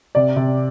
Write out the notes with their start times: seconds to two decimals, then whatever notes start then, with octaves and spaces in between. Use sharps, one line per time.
0.15 C3 D5
0.36 C3